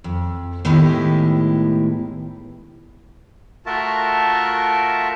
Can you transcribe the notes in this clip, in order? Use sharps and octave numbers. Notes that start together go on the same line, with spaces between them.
F2
A2 D#3 G#3 B3 E4 G4
A3 F4 F#4 A#4 E5 A5